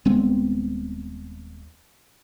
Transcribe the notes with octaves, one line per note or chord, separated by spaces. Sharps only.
D#1 G#3 B3 C4